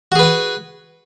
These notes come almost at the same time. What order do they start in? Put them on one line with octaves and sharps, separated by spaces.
F#4 G#4 B4 F#5